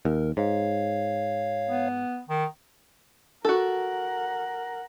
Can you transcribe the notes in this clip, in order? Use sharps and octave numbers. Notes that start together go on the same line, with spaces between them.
D#2 A#4
G#2 C#5 F5
B3
D#3
F#4 A4 A#4 F#5